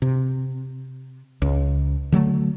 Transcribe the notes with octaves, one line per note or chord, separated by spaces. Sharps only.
C3
C#2
D3 F#3 G3 A3